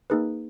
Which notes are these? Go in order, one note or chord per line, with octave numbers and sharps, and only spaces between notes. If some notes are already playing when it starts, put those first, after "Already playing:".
A#3 D#4 G#4 B4